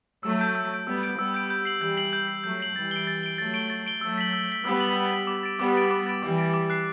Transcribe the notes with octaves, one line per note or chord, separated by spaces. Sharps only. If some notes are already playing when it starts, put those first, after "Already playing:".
F#3 A3 E6
G6 D7
E6
G6 D7
G3 B3 E6
G6 D7
G3 B3 E6
G6 D7
G6
C7 F#7
E3 G3 G6
C7 F#7
G6
C7
F#7
F#3 A3 G6
C7 F#7
E3 G3 A6
D7 G7
A6
D7 G7
F#3 A3 A6
D7 G7
A6
D7 G7
F#3 A3 E6
B6 F#7
E6
B6 F#7
G3 B3 E6
B6 F#7
E6
B6 F#7
D6
A6 D7
G3 B3 D6
A6 D7
D6
A6 D7
E3 G3 D6
A6 D7
D6
F#6 C7